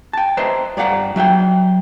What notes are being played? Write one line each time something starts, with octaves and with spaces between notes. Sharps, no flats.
G5 A5
B4 C5 D#5 E5 A5 A#5
G2 D5 F5 F#5 A#5
F#3 E5 F5 G5